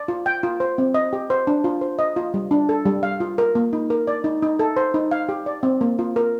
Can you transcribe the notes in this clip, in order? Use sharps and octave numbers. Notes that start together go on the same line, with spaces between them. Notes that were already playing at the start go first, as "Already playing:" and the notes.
Already playing: D5
F4
G5
F4
C5
C4
D#5
G4
C5
D4
F4
C5
D#5
F4
G3
D4
A4
G3
F5
F4
A#4
A#3
D#4
A#4
D5
D#4
D#4
A4
C5
D#4
F5
G4
D5
C4
A#3
F4
A#4